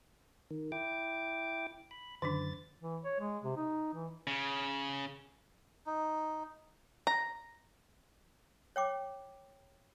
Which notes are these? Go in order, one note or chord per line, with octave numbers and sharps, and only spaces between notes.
D#3
E4 G5 D6
B5
F#2 D3 D#3 D4 A6
E3
C#5
G#3
C3
D#4
E3
C#3
D#4
A#5
C#5 G5 D6